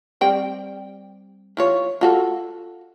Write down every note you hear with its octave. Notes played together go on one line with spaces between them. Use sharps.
G3 C4 G5
E3 F4 C#5
F4 F#4 A4